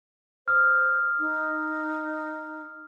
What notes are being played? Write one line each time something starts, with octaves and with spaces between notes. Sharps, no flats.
C5 D#6 F6
D#4